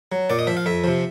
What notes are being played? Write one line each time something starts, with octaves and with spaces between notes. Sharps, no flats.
F#3
A#2 D5
D#5
F3 E5
F5
F2 E5
C3 F3